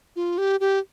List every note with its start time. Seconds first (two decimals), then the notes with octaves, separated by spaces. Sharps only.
0.16 F4
0.38 G4
0.60 G4